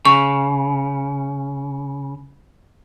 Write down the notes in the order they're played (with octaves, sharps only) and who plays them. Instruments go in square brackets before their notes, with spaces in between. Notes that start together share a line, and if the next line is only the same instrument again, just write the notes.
[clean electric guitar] C#3 [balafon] C#6